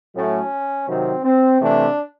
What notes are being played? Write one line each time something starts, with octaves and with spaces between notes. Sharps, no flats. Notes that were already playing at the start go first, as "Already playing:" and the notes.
A2 F#3 A3 C#4
C3 D#3 F#3 C4
C4
C3 E3 A3 D4